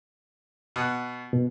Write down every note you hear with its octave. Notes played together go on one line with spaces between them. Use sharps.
B2 F#5
B2